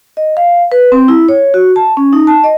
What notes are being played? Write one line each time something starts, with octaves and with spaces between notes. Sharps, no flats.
D#5
F5
B4
C4
E4
C#5
F#4
A5
C#4
D#4
A5
D#5